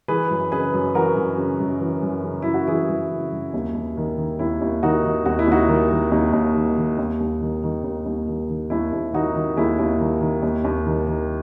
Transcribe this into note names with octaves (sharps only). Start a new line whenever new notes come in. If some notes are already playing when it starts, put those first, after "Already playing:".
E3 G#4 B4
F#2
C#3 G#4 B4
F#2
E3 F#4 A#4
F#2
C#3
F#2
E3
F#2
C#3
F#2 E4
F#4
E3 E4 G#4
F#2
C#3
F#2
D#2
D#2
D#3
D#3
D#2 E4
D#2
D#3 D#4 F#4
D#3
D#2 F#4
E4
D#2 D#4 F#4
D#3
D#3
D#2 D#4
D#2
D#3
D#3
D#2
D#2
D#3
D#3
D#2
D#2
D#3
D#3
D#2 E4
D#2
D#3 D#4 F#4
D#3
D#2 E4 G#4
D#2
D#3
D#3
D#2
D#2
D#3
D#3